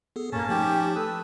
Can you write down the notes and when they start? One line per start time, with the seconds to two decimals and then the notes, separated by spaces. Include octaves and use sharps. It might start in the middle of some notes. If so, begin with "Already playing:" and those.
0.16 B3 G#4 A4
0.32 G2 A#2 A#3 C#4 A5
0.49 F3 A3 D#4 G4
0.95 A4 B4 D#6 E6